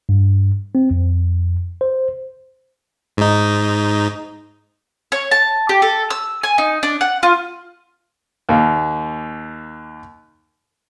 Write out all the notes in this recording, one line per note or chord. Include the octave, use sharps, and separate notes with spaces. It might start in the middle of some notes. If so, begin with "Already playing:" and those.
G2
C4
F2
C5
G#2 D#4
C#5
A5
G4
A4
E6
G#5
D#4
D4
F#5
F4
D#2 A#3